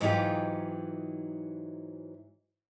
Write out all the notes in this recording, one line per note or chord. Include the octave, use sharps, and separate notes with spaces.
G#2 E3 F#3 D#4 F4 G4